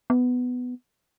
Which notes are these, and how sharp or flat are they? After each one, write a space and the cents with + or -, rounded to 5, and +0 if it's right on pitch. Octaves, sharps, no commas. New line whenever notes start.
B3 +10